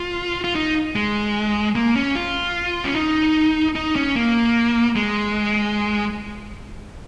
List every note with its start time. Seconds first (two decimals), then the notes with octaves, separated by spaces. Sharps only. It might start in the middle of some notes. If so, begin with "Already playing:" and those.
Already playing: F4
0.44 F4
0.55 D#4
0.96 G#3
1.75 A#3
1.96 C#4
2.16 F4
2.85 C#4
2.95 D#4
3.76 D#4
3.96 C#4
4.16 A#3
4.96 G#3